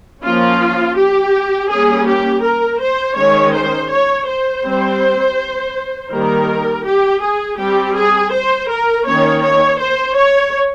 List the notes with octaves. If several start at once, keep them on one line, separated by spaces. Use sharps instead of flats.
F3 A#3 C#4 F4
G4
G3 A#3 C#4 G#4
G4
A#4
C5
D#3 G#3 C#4 C#5
C5
C#5
C5
G3 C4
D#3 G3 A#3 A#4
G4
G#4
G3 C4 G4
G#4
C5
A#4
D#3 A#3 C#4 C#5
C#5
C5
C#5